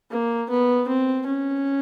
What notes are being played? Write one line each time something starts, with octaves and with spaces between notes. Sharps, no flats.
A#3
B3
C4
C#4